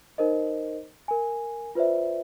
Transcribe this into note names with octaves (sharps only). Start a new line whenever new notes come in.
D#4 A#4 C5 D#5
A#4 G#5
F4 B4 C5 D5 E5